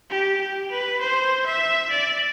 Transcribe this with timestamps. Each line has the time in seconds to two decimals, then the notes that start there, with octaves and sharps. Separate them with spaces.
0.10 G4
0.41 G4
0.71 B4
1.00 C5
1.46 E5
1.91 D5